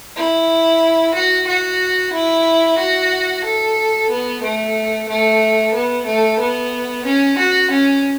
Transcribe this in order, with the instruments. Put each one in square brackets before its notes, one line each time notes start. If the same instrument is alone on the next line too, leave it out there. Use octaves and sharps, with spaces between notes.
[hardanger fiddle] E4
F#4
F#4
E4
F#4
A4
B3
A3
A3
B3
A3
B3
C#4
F#4
C#4